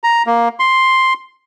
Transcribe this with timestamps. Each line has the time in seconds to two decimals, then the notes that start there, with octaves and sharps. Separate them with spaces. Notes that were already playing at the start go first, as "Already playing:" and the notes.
0.04 A#5
0.27 A#3
0.60 C6